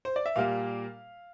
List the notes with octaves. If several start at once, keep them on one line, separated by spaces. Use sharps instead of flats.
C5
D5
E5
A#2 G3 A#3 F5